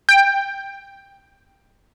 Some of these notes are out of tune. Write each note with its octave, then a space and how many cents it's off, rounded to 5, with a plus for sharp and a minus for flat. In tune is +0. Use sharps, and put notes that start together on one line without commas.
G5 +10